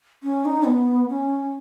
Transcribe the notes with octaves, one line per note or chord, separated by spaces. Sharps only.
C#4
D#4
B3
C#4